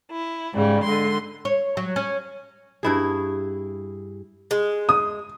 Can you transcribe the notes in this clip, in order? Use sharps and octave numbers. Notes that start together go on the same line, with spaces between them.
E4
G#2 C#3 G3
D3 G#3 C6
C#5
F#3
C#4
G2 E4 G#4
G#3
D#6